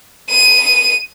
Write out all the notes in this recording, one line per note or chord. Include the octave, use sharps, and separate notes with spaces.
D#7